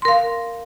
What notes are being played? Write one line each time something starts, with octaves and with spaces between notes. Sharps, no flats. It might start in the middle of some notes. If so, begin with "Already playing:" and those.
A#4 F5 C6